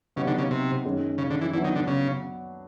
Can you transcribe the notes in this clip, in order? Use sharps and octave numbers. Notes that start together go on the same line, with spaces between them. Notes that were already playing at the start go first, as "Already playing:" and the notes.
C#3 F#3 B3 D#4 G4
D3
C#3
C3
F#2 D#3 G#3 C#4
C#3
D3
E3
E3 F#3 B3 D4
D#3
D3
C#3